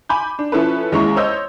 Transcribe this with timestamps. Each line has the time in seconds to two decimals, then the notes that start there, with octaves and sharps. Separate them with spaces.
0.09 G#5 B5 D6 G6
0.39 D4
0.52 F3 C#4 E4 A4 B4
0.92 D#2 G#3 C#4 E4 A#5 C#6
1.16 C5 C#5 D#5 E6 G6